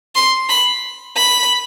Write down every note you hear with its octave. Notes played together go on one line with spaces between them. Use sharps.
C6
B5
B5